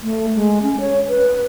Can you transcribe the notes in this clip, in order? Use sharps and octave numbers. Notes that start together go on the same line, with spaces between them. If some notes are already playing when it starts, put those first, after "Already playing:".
A3
G#3
C#4
C#5
B4